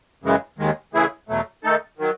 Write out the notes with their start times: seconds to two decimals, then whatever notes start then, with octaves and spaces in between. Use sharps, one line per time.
0.23 F#2 C#3 E3 G#3
0.59 D#2 D#3 G#3
0.93 C#3 E3 A3 E4 G#4
1.29 E2 B2 F#3 A3
1.64 D#3 A3 D#4 A4
1.98 D#3 F#3